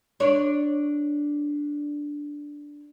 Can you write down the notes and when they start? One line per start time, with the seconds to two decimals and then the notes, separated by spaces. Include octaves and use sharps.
0.20 D4 C#5